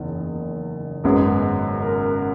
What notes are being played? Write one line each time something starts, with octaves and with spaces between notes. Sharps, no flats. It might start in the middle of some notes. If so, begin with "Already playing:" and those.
Already playing: F#1 E2 D#3
G#1 F#2 C#3 G#3 B3
A#4